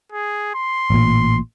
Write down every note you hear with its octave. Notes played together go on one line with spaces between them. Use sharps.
G#4
C6
A1 A#2